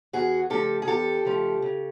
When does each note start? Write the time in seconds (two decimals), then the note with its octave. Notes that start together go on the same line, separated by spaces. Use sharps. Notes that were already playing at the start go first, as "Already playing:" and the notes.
0.13 E2 F#4 G#4
0.50 C#3 F3 A3 G4 A4
0.82 G#4
0.88 E2 G4 A4
1.25 C#3 F3 A3
1.62 C#3